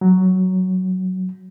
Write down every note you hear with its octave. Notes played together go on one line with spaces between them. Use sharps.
F#3